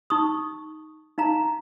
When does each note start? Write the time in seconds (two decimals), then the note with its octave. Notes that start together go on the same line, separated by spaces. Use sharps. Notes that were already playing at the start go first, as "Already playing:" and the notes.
0.10 D#4 C#6 D#6
1.18 D#4 F5 A#5